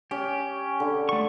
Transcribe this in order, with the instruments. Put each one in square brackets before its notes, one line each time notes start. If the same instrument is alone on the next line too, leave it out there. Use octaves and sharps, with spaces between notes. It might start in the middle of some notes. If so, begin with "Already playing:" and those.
[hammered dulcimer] C#4 [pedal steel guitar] G4
[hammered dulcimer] D3
[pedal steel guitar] A3 C#6